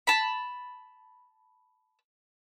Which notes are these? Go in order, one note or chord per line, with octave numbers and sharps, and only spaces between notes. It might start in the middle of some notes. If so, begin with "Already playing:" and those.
A5 B5